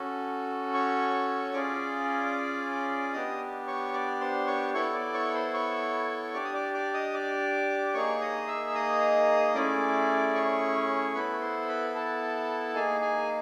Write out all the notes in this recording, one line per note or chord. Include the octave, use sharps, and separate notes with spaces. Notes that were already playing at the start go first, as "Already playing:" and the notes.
Already playing: C#4 F#4 A4
C#5 C#6
C#4 F4 G#4 D5 D6
B3 D4 G4 D#5 D#6
C#5 C#6
D5 D6
C5 C6
C#5 C#6
B3 E4 A4 C#5 C#6
D5 D6
C#5 C#6
C5 C6
C#5 C#6
D4 G4 D5 D6
D#6
D5 D6
D5 D6
D#5 D#6
D5 D6
A#3 D#4 G#4 C#5 C#6
D#5 D#6
E5 E6
D#5 D#6
A3 C#4 E4 G#4 D5 D6
C#5 C#6
B3 E4 A4 B4 B5
C5 C6
B4 B5
A4 A5
A#3 D#4 G#4 G#5
G#4 G#5